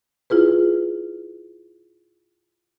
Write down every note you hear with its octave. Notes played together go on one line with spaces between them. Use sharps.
E4 F4 G#4 B4